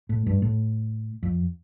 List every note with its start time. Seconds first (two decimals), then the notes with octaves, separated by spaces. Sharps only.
0.09 A2
0.27 G2
0.42 A2
1.23 F2